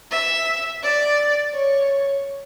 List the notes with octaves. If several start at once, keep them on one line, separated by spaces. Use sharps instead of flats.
E5
D5
C#5